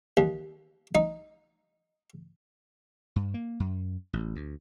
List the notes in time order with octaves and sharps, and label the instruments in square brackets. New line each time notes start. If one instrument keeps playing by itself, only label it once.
[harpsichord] D#2
D#4
[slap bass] G2
A#3
F#2
A1
D2